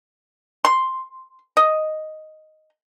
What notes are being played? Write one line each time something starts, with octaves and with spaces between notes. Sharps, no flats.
C6
D#5